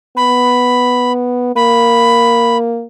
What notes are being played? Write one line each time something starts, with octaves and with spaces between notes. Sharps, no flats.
B3 B5
A#3 B5